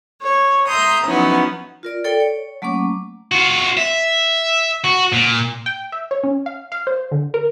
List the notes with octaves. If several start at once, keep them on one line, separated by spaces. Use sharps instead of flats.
C#5
E5 A#5 C6 D#6 G6
F3 F#3 B3 C#4 D#4 E4
F4 A#4 D5
A4 C#5 D5 G5
C#5
F#3 A3 A#3 C#4 D6
F4 F#4
E5
F#4
A#2
G5
E5
C#5
C#4
F5
F5
C5
D3
A#4